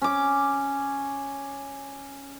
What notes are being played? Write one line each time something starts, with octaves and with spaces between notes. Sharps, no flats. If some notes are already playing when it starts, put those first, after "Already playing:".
C#4 D6